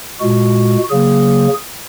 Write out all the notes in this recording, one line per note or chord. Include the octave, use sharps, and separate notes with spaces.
A#2 G#3 F#4
C#3 F#3 A#3 G#4